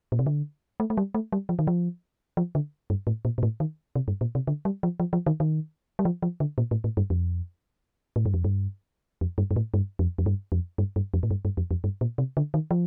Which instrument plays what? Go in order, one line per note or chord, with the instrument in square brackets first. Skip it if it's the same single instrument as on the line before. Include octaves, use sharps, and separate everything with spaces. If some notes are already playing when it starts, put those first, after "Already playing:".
[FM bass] A#2
C3
D3
A3
A3
G3
A3
G3
F3
D#3
F3
F3
D3
G2
A2
A#2
A#2
A2
D#3
C3
G2
A#2
C3
D3
G3
F3
F3
F3
D#3
D#3
G3
F3
F3
D3
A#2
A2
A2
G2
F2
A2
G2
F2
G2
F2
G2
G2
A2
G2
F2
F2
G2
F2
G2
G2
F2
A2
G2
G2
F2
F2
G2
A#2
C3
D3
D#3
F3